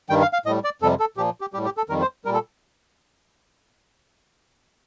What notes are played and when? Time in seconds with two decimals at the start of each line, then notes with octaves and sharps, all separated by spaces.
0.10 G2 D#3 G3 G5
0.22 F5
0.33 F5
0.46 A2 D#5
0.50 G3
0.64 D5
0.82 F2 C3 G3 A4
1.00 A4
1.17 A#2 F3 G4
1.41 G4
1.53 G3 G4
1.56 A2
1.65 G4
1.77 A4
1.89 F2 D#3 G3 A#4
2.01 C5
2.25 G3 A#4
2.28 A#2
2.34 A4